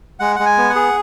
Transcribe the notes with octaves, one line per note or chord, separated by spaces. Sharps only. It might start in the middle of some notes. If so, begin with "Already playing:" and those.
G#3 F#5
G#3 F#5
G#5
B3
F#5
G#4